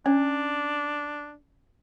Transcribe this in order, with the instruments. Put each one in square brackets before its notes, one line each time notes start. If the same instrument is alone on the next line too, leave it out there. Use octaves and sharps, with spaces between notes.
[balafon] C#4 [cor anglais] D4